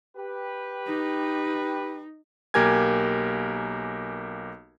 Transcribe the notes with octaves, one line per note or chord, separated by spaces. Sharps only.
G4 B4
D#4
B1 A#3 G4 A#4 G#5 G#6